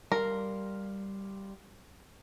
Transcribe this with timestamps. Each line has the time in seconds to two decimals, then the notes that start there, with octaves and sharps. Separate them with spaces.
0.12 G3 A#4 F5 C6